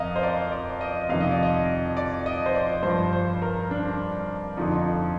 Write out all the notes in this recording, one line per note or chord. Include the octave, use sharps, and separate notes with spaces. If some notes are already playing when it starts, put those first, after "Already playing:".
Already playing: F2 A#4 D#5 F5
C5
D5
D5
D#5
F2 C3 D#3 F5
D#5
D5
D#5
D5
D#5
C5
D5
G2 F3 C5
C5
A#4
D4
F2 D3 F3 D#4